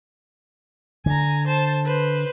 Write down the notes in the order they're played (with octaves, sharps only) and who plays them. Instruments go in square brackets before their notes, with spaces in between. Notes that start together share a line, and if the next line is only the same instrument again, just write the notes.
[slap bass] D3 [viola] G#5 A#5
[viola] C5 A5
B4 C5